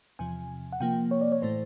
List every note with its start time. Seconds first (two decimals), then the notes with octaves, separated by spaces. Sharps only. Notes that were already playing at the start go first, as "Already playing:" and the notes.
0.19 E2 C3 F3 G#5
0.72 F#5
0.80 C3 F3 A#3 G5
1.11 C#5
1.21 D5
1.32 C#5
1.42 A2 E3 A3 C5